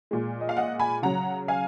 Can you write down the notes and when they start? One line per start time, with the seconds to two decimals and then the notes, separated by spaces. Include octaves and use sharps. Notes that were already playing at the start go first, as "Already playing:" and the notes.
0.11 A#2 G#3
0.41 D#5
0.49 F5
0.57 D#5 F#5
0.79 G#5 B5
1.03 C#3 F#3 F#5 A#5
1.48 F5 G#5